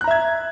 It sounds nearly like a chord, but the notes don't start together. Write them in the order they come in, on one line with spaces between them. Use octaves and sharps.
F#6 A#5 E5 G#6